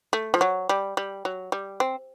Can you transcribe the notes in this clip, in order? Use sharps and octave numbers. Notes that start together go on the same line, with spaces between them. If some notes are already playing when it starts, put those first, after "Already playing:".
A3
F3
F#3
G3
G3
F#3
G3
C4